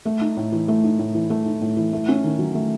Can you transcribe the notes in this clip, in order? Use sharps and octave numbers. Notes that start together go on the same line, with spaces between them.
A3
D#4
A2
E3
A3
D#4
A2
E3
A3
D#4
A2
E3
A3
C#4
D#3
F#3
A3